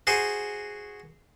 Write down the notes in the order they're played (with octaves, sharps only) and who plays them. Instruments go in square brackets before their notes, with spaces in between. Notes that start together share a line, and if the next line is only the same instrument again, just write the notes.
[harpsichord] F#4 G#4 C5